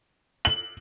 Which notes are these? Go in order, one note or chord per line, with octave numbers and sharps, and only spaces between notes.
F#7